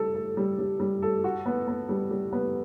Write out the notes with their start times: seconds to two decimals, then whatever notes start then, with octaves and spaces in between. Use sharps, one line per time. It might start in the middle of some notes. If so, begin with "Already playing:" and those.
Already playing: G3 A4
0.15 A4
0.37 G3
0.59 G3
0.80 G3
1.02 A4
1.24 F#4
1.46 B3
1.68 B3
1.89 G3
2.11 G3
2.33 B3